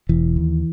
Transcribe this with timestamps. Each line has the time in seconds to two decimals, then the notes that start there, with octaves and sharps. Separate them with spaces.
0.09 E1 E3
0.36 D#2